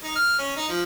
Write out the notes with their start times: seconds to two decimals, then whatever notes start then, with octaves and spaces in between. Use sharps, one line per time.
0.04 D#4
0.16 F6
0.39 C#4
0.56 D#4
0.69 F3